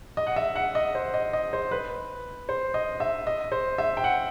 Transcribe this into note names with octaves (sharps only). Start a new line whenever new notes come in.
D#5
F#5
E5
F#5
D#5
C5
D#5
D#5
C5
B4
C5
D#5
E5
D#5
C5
E5
G5
F#5